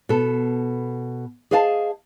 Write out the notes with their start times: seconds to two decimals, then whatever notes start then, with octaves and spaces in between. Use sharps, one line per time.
0.09 B2 A4
1.51 G#4 C5 D#5 F5 G5 A5